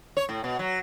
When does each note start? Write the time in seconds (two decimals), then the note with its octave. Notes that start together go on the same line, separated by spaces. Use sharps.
0.17 C#5
0.29 A2
0.44 B2
0.59 F#3